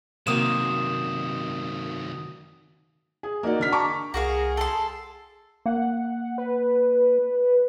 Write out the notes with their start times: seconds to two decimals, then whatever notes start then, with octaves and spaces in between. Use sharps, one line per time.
0.27 C3 D#3 F#3 A#3 F#4 F5 D#6 E7
3.23 G#4
3.43 A#3 D#4 F#4 D5
3.59 D3 F6 B6
3.72 A5 A#5 C#6 D6
4.14 C2 F#4 G#4 A#4 F5
4.57 A4 C6
5.66 A#3 F#5
6.38 B4